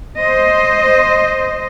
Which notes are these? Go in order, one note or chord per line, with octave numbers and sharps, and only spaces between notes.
C5 D#5